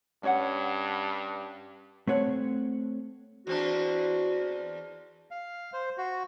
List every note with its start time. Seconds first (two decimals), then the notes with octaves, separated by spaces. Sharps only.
0.23 G2 C#4 C#5 F#5
2.07 A3 C4 C#5 F#5
3.47 E2 C4 D4 F#4
5.31 F5
5.73 C5
5.98 F#4